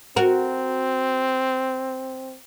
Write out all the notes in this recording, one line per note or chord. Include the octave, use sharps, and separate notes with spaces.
C4 F#4 A#4